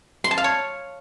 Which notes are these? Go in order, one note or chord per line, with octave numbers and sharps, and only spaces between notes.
C6
A5
F5
C#5